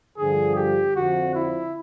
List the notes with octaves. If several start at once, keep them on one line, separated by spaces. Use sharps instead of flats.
G2 D3 F3 G#4
G4
F2 D3 F3 F#4
E4